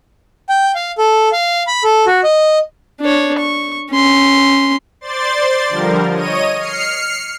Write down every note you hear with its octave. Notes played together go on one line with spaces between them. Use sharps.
G5
F5
A4
F5
B5
A4
F#4
D#5
D4 C#5
C#6
C#4 C6
C5 D5 C6 A6
D3 F3 G3 A#4
C#5 D#5 D#7
F6 C7 C#7